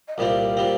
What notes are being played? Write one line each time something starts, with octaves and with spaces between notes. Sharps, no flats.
D#5
C2 A#2 G3 C4 F5
A#2 G3 C4